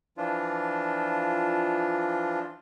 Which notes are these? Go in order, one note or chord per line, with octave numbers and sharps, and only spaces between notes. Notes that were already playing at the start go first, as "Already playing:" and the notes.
E3 F3 D4 F4